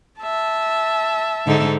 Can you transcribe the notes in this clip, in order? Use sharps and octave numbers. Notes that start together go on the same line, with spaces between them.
E5 A5
G#2 D3 D#4